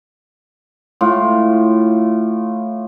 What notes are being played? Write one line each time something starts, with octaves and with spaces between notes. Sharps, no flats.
A2 F4